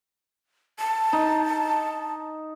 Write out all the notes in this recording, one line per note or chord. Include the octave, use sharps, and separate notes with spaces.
A5
D#4